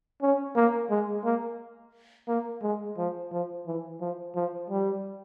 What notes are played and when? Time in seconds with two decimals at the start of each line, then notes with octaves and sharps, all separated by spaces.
0.22 C#4
0.56 A#3
0.90 G#3
1.24 A#3
2.28 A#3
2.62 G#3
2.98 F3
3.31 F3
3.67 E3
4.01 F3
4.35 F3
4.70 G3